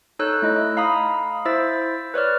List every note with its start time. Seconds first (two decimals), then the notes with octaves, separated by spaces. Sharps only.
0.19 D#4 A4 C#5 E6 F#6 G6
0.42 A3 E4 D#5
0.77 F5 A#5 B5 D#6
1.45 E4 C5 E5 E6 A6
2.14 B4 C#5 D5 F6